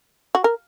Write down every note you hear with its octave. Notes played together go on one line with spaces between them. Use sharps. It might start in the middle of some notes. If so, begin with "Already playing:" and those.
F#4
A#4